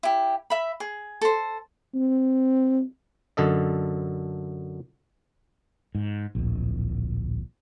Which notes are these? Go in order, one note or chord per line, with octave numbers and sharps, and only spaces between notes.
E4 G4
E5 B5
G#4
A4 C5
C4
F#2 D3 A4 D#5
G#2
D1 A#1